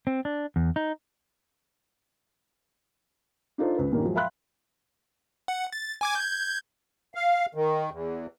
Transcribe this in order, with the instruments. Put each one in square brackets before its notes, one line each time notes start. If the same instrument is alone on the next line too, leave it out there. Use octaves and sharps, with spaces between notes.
[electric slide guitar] C4
D4
E2
D#4
[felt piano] D4 D#4 F4 A4 C5
C#2 B4
G2 A#2 D#3 A#3 C#4
F3 F#3 G#3
E5 F5 G5 B5 C6 F#6
[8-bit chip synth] F#5
A6
G#5 D6 G#6
G6 G#6
[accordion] F5
D#3
E2